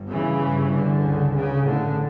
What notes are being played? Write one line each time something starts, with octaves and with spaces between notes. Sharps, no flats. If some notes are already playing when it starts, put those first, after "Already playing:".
Already playing: G1 G2
C#3 E3
G1 G2
D3
C#2 C#3
C#3
A1 A2 D3